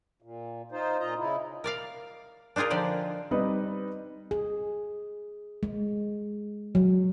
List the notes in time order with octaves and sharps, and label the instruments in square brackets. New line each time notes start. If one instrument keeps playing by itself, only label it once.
[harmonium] A#2
D#4 F4 C5
A#2 F4 D#5 A#5
C#3 D#4 E4
[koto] A#4 D5 F5
D4 D#4 F4 G#4 A#4
D3 F3 G4 D5
[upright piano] G3 C4 D#4 B4 D#5
[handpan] G#4
G#3
F#3